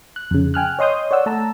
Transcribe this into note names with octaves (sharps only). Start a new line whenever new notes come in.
F#6
F2 C#3
G5 G#5 F6 F#6
C#5 D#5 C6 D#6 G6
C#5 D5 F#5 E6
A3 A5 A#5 E6